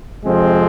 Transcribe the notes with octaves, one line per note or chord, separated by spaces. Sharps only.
F2 C3 F3 G#3 C4